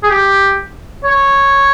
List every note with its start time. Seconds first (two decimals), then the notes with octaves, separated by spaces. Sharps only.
0.03 G#4
0.10 G4
1.04 C#5